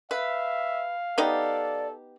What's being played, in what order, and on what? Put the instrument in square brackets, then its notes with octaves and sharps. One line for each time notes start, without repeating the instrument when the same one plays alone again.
[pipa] B4 [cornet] E5 [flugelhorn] F5
[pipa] B3 D#4 G4 [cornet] A4 [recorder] D5